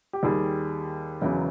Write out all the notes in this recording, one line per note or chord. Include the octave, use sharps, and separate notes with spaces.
G4
D#2 D#3 G3 G#4
E1 E2 C#3 F#3 B3